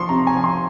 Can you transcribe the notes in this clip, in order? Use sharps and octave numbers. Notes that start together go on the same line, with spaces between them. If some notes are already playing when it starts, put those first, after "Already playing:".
Already playing: F3 C6 C#6
C3 A#5
G#5
F3
C6